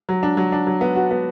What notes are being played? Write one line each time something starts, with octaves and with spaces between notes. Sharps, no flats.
F#3
D4
F#3
D4
F#3
B3
F#4
B3